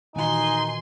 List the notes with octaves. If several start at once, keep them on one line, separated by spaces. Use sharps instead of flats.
A#2 D#3 E3 D#4 F#4 G#5 C6